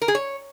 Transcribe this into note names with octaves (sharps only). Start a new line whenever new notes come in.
A#4
G#4
C#5